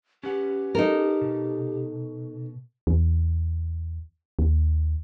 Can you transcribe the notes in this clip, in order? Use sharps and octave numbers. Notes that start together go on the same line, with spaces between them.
C#4 G4 B4 F#5
D#4 A4 A#4
B2
E2
D#2